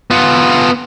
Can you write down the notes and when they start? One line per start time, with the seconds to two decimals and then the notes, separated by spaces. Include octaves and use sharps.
0.11 B3 F4